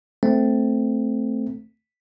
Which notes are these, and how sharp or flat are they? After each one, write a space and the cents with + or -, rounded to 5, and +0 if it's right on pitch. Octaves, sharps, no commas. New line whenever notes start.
A3 +0 C4 -5